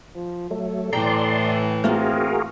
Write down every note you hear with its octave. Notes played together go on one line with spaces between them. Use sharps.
F3
F#3 A3 A4
A2 E3 D5 G5 A#5 C6
A3 A#3 C4 F4 F#4 G#4 A#4